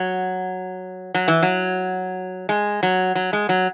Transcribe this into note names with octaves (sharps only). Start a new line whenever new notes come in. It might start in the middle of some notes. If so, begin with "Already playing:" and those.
Already playing: F#3
F#3
E3
F#3
G#3
F#3
F#3
G#3
F#3